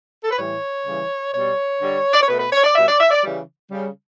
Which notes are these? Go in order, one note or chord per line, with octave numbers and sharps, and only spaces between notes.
A4
B4
A2 E3 G3 C#5
C#3 E3 G3
B2 G3 C#5
D3 G3
D5
C#5
B2 A3 B4
B4
C#5
D5
B2 G3 E5
D5
E5
D5
C#3 E3 G3
C#3 G3